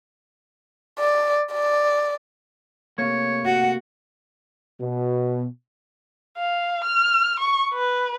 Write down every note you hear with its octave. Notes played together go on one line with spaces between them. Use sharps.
D5
D5
C3 A3 A#3 C#5
F#4 F#5
B2
F5
F6
C#6
B4